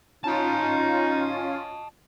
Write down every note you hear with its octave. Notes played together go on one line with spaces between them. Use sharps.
C#4 D#4 F4 D#5 A5